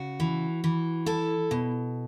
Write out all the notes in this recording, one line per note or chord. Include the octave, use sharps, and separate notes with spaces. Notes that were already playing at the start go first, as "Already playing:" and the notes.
Already playing: C#3 F#4
E3
E3
E4 A4
B2